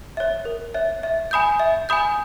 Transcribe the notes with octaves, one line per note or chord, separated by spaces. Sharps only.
C#5 E5
A#4
C#5 E5
E5
G#5 B5 D#6 G6
E5
G#5 B5 D#6 G6